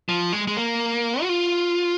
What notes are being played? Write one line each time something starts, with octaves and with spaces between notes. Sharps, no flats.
F3
G#3
G#3
A#3
F#4
F4